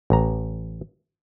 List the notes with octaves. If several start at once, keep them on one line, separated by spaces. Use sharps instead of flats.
A1 A#5